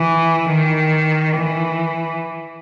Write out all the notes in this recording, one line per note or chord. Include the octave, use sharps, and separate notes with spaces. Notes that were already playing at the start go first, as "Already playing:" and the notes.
Already playing: E3
D#3
E3